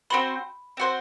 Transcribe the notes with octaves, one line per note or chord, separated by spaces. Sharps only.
C4 F#4 C5 B5
C4 F#4 C5